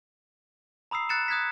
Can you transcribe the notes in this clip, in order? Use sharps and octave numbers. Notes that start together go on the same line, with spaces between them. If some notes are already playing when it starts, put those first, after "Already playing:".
A#5 B5 D#6 E6 C7
F#6 A6 C#7 E7
D#6 F#6 G#6 A6 B6